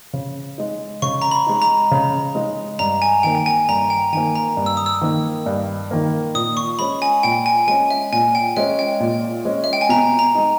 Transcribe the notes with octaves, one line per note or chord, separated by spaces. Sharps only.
C#3
G#3 D#4
C#3 C#6
A#5
B5
G#3 D#4
A#5
C#3
G#3 D#4
G2 A#5
G#5
D#3 A#3 G5
G5
G#5
G2 A#5
G5
D#3 A#3 G#5
A#5
G2
E6
D#6
E6
D#3 A#3
G2
D#3 A#3
A#2 D#6
C#6
G#3 C#4 B5
G#5
A#2 G5
G#5
G#3 C#4 G#5
E5
A#2 G#5
G5
G#3 C#4 E5
G5
A#2
G#3 C#4
E5
G5
G#5
B2 A#5
A#5
G#3 D#4